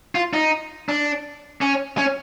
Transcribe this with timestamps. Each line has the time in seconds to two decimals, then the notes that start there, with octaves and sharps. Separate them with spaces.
0.15 F4
0.33 D#4
0.89 D4
1.61 C#4
1.98 C#4